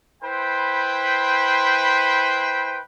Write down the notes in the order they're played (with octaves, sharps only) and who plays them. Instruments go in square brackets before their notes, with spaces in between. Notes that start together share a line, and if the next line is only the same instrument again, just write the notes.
[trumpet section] E4 B4 C5 G5 B5 C6